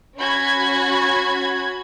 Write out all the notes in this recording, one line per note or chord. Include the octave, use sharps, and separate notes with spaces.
C#4 F#4 B5 G#6